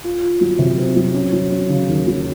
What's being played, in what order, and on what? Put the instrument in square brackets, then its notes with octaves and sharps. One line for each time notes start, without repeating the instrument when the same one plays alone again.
[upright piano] F4
F4
F#3
C3
C4
F#3
C#4
F#3
C#4
C#3
D#2
F#3